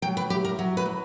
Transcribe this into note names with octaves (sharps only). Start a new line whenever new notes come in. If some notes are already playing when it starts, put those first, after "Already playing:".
F#3 G5
B4
E4 G4
A#4
F#3
B4
F#3